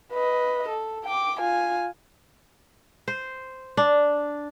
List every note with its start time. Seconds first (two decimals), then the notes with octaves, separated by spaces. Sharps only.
0.13 B4 D#5
0.69 A4
1.04 G5 D6
1.40 F4 G#5
3.08 C5
3.77 D4